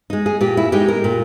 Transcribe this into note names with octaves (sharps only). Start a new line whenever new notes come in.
G#3 D#4
G#4
A#2 G4
E4
G#3 D#4 G4
A#4
A#2